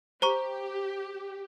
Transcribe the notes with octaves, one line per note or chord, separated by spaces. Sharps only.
G4 C5 A#5 C#6